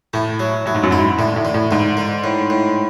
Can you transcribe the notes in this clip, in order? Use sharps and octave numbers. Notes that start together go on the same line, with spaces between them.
A2 A3
F#3
A2 F#3
G#2
F#2
G#2 E4
A2 D3
A2
D3
A2
G#2 D3
D3
A2
A2